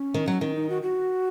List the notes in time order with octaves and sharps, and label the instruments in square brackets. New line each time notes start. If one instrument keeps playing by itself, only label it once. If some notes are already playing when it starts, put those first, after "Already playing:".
Already playing: [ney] C#4
[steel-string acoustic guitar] D#3
F#3
D#3
[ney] D#4
F#4
F#4